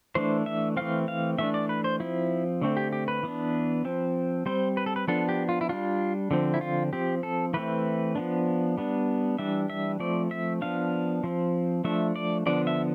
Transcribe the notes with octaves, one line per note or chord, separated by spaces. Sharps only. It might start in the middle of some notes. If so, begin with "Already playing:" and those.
E3 A3 D4 C5
E5
E3 A3 C4 F5
F5
E3 A3 D4 E5
D5
B4
C5
F3 C4 E4
D3 A3 C4
G4
G4
B4
E3 B3 D4
F3 C4
G3 C4 C5
B4
A4
B4
F3 B3 D4 A4
G4
F4
E4
G3 D4 F4
D3 F3 C4
E4
F4
F3 C4 G4
A4
E3 A3 C4 B4
F3 B3 D4
G3 B3 D4
E3 G3 D4 E5
E5
F3 A3 C4 D5
E5
F3 B3 D4 F5
F3 C4
F3 A3 D4 E5
D5
D3 F3 B3 D4 D5
E5